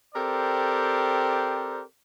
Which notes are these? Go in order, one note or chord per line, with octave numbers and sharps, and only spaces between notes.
C4 G4 A4 A#4 C5 D5